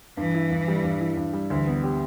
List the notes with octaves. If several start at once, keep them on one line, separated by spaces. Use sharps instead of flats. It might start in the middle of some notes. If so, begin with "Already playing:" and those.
G2 E3
E4
G2
G3
G2
E4
G2
G3
D2 E3
B3
G4